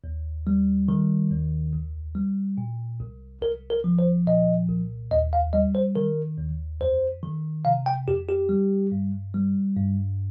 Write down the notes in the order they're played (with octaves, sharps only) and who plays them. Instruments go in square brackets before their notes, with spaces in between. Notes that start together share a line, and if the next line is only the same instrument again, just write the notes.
[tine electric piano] D#2
G3
D#3
D#2
C2
G3
A#2
C2
C2 A#4
A#4
F3
C5
A#2 D#5
C2
D#2 D#5
F5
G3 D#5
C5
D#3 A#4
D#2
F2 C5
D#3
C3 F5
G5
F2 G4
G4
G3
G2
G3
G2